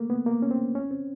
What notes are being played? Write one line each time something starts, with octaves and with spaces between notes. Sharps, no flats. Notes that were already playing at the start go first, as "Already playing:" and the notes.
Already playing: A3 A#3
B3
A#3
C#4
C4
C#4
C4